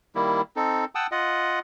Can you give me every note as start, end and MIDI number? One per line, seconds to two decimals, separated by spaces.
0.15 0.42 51
0.15 0.42 55
0.15 0.42 58
0.15 0.42 64
0.56 0.85 60
0.56 0.85 63
0.56 0.85 69
0.95 1.07 78
0.95 1.07 79
0.95 1.07 81
0.95 1.07 87
0.95 1.07 88
1.12 1.59 65
1.12 1.59 75
1.12 1.59 78